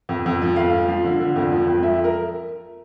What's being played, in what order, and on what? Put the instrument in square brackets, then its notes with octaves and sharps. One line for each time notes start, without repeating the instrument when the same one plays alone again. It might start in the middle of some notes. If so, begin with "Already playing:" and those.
[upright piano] F2
F2
F3
F2 F5
F3
F3
D3
D3
F2
F3
F2
F3 E5
A#4